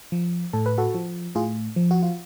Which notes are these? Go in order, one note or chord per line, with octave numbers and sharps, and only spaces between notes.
F3
A2 A4
B4
F#4 A4
F3
A2 F4 G#4
F3
F#4
F4